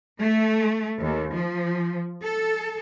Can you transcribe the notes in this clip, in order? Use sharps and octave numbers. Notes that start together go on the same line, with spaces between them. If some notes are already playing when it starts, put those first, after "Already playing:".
A3
D#2
F3
A4